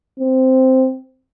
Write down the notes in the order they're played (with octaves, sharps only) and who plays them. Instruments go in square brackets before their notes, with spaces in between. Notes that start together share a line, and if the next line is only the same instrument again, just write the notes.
[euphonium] C4